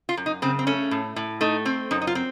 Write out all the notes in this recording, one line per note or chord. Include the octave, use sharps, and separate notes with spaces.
F4
F#2
D#4
C#3 C4
C4
A3 C#4
A2
A2
A3 D#4
C4
F#2 D#4
D#4
F4
C4